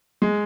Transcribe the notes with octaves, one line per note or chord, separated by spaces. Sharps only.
G#3